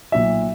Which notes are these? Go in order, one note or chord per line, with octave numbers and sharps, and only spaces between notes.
B1 A#2 F#3 E5